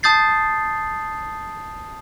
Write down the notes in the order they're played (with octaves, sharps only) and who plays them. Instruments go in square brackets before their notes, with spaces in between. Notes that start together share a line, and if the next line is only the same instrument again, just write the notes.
[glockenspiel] A5 D#6 G6 A6 C7